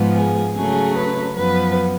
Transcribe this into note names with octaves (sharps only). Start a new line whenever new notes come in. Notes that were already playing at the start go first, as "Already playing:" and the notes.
Already playing: G#2 F3 B3
G#4
C#3 F#3 A3 G#4
B4
F#2 F3 B3 B4